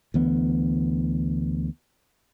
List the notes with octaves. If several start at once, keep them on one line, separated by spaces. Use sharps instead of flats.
D2 E3 B3